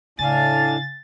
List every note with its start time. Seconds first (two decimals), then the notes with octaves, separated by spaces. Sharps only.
0.19 A2 C#3 D4 F5 G#5 A6